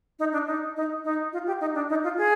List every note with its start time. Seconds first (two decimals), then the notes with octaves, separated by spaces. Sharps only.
0.19 D#4
0.33 D4
0.47 D#4
0.76 D#4
1.04 D#4
1.33 F4
1.47 G4
1.61 D#4
1.74 D4
1.89 D#4
2.04 F4
2.18 G#4